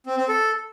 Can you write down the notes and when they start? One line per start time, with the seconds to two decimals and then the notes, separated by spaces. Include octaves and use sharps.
0.06 C4
0.17 C4
0.28 A4